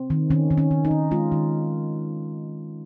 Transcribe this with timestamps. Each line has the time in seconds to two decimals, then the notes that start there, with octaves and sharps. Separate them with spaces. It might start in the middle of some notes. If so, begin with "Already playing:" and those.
Already playing: C4
0.10 D#3
0.30 D#3 C#4
0.51 D#3
0.58 C#4
0.71 D#3
0.85 D#4
0.91 D#3
1.11 G#3 F4
1.32 D#3